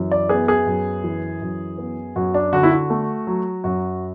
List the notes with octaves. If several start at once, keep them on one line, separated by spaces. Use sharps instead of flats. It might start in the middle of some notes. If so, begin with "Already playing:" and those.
Already playing: F#2 E3
D5
B3 G#4
G#4
F#2
E3
F#2
B3
F#2 F#4
D4
D3 F#4
E4
F#4
A3
F#3
F#2 F#4